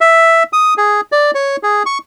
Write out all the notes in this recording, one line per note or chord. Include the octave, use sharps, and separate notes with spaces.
E5
D#6
G#4
D5
C#5
G#4
C#6